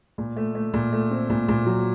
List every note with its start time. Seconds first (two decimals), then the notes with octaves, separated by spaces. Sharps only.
0.18 A#2
0.37 A3
0.55 A3
0.74 A#2
0.92 A3
1.11 C4
1.30 A#2
1.48 A#2
1.66 F#3